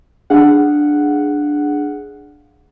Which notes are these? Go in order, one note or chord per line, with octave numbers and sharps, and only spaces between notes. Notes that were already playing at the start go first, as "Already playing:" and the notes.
D4 G#4 F5 F#5